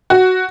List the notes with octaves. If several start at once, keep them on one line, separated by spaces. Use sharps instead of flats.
F#4